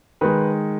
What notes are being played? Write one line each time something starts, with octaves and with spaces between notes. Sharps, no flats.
D#3 G#3 B4